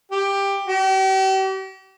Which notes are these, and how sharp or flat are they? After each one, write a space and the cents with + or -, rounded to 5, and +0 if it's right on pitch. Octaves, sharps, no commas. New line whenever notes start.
G4 +15
G4 -40